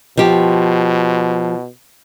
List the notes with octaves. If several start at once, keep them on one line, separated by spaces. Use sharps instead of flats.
B2 F3 G4